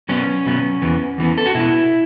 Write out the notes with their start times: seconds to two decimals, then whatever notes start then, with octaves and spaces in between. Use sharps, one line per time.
0.09 B2 F#3 B3 C#4
0.46 B2 F#3 B3
0.82 E2 E3 B3
1.18 E2 E3 B3
1.38 A4
1.46 F#4
1.55 B2 B3 E4